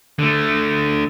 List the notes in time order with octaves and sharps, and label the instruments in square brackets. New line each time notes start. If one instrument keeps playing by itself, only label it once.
[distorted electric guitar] D3 A3